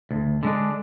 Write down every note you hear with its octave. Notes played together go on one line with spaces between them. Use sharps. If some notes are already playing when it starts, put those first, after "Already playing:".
D2
D3 G#3 D4